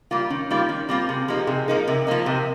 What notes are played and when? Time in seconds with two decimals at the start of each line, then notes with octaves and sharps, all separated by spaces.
0.11 G3 A#3 F4
0.30 D#3 C#4
0.50 G3 A#3 D#4 F4
0.69 D#3 C#4
0.89 G3 A#3 C4 F4
1.09 C3 G#4
1.28 F3 A#3 D#4 G4
1.47 C3 G#4
1.68 F3 A#3 D#4 A#4
1.87 C3 A#4
2.07 F3 A#3 D#4
2.26 C3 A#4